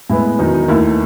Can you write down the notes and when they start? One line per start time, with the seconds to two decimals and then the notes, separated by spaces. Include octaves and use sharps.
0.10 A2 G#3 B3 E4
0.39 E2 D#3 F#3 D#4
0.54 D#4
0.68 D#2 D#3 A3 E4